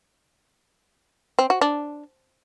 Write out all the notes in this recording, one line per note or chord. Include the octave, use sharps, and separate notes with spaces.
C4
F#4
D4